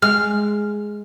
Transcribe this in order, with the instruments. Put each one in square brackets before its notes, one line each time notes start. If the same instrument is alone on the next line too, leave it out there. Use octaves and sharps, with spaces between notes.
[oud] G#3 [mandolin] F6